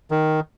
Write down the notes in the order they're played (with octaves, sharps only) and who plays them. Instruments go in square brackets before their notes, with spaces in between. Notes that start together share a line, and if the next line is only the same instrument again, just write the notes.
[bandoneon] D#3